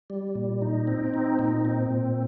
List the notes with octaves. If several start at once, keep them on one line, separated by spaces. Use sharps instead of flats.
G3
A#2
D#4
C4
D#4
A#2
C4
A#2